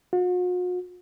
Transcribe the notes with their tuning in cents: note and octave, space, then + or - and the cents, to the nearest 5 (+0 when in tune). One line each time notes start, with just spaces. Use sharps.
F#4 -45